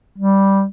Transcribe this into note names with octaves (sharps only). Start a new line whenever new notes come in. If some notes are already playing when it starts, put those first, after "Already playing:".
G3